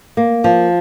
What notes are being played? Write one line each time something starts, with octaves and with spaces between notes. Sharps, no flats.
A#3
F3